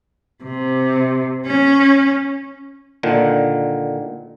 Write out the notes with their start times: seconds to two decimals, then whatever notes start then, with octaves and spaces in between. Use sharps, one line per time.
0.45 C3
1.47 C#4
3.03 A#2 D3 D#3